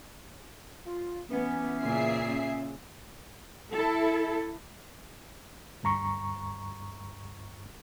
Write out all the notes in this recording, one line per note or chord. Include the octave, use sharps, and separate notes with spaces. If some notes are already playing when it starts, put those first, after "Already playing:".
F4
E3 B3 C#4
A#2 C#3 G#4 E5 C7
E4 A4
D2 G2 A#5 C#6